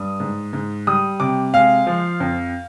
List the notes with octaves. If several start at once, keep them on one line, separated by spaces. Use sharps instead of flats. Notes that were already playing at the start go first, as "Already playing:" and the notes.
Already playing: G2 D#6
G#2
G#2
G3 D#6
C3 D6
G#3 F5
F3
F2